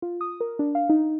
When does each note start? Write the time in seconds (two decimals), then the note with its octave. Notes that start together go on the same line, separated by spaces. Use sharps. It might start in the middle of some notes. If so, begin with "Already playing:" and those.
0.02 F4
0.21 D#6
0.40 A#4
0.59 D4
0.75 F5
0.89 D#4